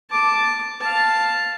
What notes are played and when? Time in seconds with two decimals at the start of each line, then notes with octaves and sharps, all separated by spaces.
0.10 A5 D6
0.81 F5 A5